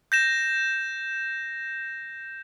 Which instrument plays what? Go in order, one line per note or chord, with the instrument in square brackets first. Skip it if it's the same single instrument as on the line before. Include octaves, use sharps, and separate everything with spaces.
[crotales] G6 A#6 E7